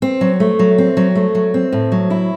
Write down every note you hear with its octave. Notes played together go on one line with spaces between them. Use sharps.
C4
F#3
A3
F#3
C4
F#3
A3
F#3
C4
A2
F#3
E4